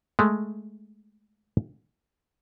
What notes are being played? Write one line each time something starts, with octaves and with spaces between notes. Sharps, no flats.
G#3 A3